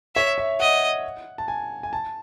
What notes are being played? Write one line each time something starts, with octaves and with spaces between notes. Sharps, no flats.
C#5 E5
E5
D#5 F#5
A5
G#5
G#5
A5